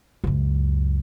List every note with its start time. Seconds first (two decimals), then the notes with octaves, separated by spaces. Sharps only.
0.24 C#2 F#2